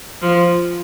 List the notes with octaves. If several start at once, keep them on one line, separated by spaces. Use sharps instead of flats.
F3